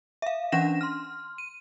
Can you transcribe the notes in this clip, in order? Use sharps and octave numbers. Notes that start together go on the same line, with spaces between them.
E5 F5
E3 C#4 D4 F#5 A#6 E7
C6 F6
D#7